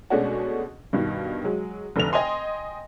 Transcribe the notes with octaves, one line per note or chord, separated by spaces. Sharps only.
B2 G#3 A3 C#4 D4 F#4
G2 B2 D#3
F#3 G#3
F1 D3 F7
D#5 G5 G#5 C6